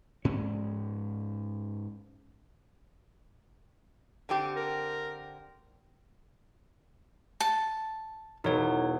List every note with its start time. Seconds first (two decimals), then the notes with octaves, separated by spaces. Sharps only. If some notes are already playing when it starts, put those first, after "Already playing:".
0.25 G#2 C#4
4.29 D3 C4 G4
4.56 A#4
7.40 A5
8.44 E1 B2 D#4 C#5